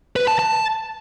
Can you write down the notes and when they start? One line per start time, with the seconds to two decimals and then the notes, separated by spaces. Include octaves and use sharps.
0.16 B4
0.28 A5
0.39 A5